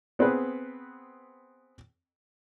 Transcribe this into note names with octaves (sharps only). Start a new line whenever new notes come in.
B3 C4 G#4 B4